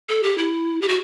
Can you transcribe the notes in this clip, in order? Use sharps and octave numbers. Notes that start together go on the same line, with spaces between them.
A4
G4
E4
G4
F#4